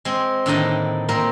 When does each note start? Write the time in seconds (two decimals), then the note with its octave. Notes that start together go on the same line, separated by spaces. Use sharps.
0.05 G#3 C4
0.46 A2 D3 D#3 A#3 D4 D#5
1.09 A#2 A#3 C4 A#4